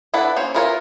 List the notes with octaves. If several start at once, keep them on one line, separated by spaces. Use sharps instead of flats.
D4 E4 A4 B4 F#5
A#3 C#4 C5 C#5
E4 F4 A#4 B4 C#5